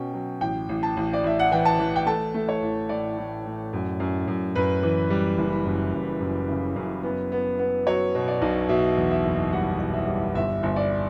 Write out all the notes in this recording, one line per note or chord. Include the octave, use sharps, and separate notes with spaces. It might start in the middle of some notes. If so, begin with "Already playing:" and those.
Already playing: B2 C#4 G5
F#3
A1 G5
A1
A5
A1
D5
A1 E5
F#5
E3 G5
A5
E3
G5
A3 A5
A3
C#5
A1
A2 D5
A2
A2
F#2
F#2
F#2
F#2 B4
E3
G3
F#1
F#2
F#1
F#2
C#3
F#2
B3
B3
B3
F#3 C#5
B2
D5
B1
B2 E5
E2
E5
F#1
G3 F#5
B2
E5
G3
G1 E5
G1
D5